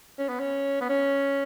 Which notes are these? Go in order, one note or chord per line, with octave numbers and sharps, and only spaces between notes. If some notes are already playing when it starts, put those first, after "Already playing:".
C#4
B3
C#4
B3
C#4